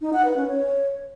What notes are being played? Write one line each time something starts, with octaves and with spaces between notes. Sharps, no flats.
D#4
F#5
B4
C#4
C#5